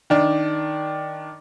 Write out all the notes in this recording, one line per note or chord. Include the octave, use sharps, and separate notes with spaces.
D#3 D4